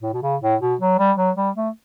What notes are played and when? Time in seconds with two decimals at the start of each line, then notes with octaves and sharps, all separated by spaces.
0.02 A2
0.13 B2
0.22 C#3
0.42 A2
0.61 B2
0.81 F#3
0.99 G3
1.17 F#3
1.36 G3
1.56 A3